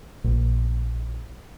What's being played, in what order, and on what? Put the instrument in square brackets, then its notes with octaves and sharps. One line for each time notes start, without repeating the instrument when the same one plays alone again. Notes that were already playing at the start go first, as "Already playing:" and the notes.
[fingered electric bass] A#1